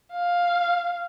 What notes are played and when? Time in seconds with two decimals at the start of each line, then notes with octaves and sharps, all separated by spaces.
0.13 F5